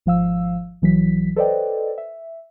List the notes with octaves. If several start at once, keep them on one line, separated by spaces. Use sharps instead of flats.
G#1 F3 F5 E6
A#1 E3 F#3 B6
A4 B4 C5 D5 D#5 G5
E5